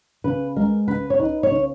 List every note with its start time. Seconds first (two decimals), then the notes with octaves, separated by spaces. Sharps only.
0.24 C#3 B4
0.56 G#3 A#4
0.88 C#3 B4
1.10 C#5
1.19 D#4 B4
1.43 C#5
1.51 C#3